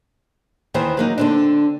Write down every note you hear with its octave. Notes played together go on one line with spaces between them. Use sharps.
D#2 D#3 E3 C5
F#3 A#3 D#4
D3 C4 D4